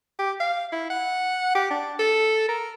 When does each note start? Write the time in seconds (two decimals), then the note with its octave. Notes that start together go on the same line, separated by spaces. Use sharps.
0.19 G4
0.40 F5
0.72 E4
0.90 F#5
1.55 G4
1.71 D4
1.99 A4
2.48 A#4